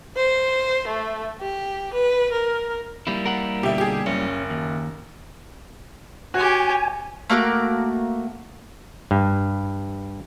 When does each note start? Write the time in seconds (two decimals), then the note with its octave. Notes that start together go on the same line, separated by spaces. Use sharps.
0.16 C5
0.88 A3
1.41 G4
1.94 B4
2.32 A#4
3.07 G3 A#3 E4
3.25 A#4 F#5
3.63 B2 D3 G4 E5
3.78 G4 G#4
4.06 F#1 C#4
4.50 D#2
6.34 F#4 G4 C#5 G#5
7.30 A3 A#3 F#4 D6
9.11 G2